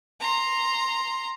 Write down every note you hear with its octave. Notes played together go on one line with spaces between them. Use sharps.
A#5 C6